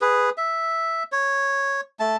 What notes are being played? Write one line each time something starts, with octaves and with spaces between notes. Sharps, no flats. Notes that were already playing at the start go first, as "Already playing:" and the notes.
G#4 B4
E5
C#5
A3 A5